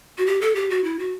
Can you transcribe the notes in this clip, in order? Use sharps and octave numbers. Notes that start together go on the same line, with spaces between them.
F#4
G4
A4
G4
F#4
E4
F#4